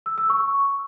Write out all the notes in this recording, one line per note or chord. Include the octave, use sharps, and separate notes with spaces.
E6
E6
C#6